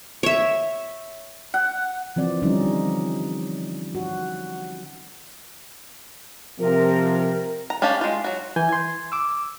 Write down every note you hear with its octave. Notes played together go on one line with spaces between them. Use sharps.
C#5 E5
F#5
E3 F3 C4 D5
D3 F3 G3 C#4 D#4
F#4
C3 F3 A#4
A#5
C#4 D4 G4 F5 A5
G#3 F4
F#3 F#4
E3 G#5 G6
C6 G#6
D6 E6